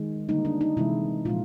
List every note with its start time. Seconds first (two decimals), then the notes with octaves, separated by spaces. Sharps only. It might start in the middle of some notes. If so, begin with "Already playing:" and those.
Already playing: D#3 G#3
0.29 D3 G3 A#3 D#4
0.45 D4
0.61 D#4
0.77 C3 E3 G#3 E4
1.25 A#2 F3 G#3 F4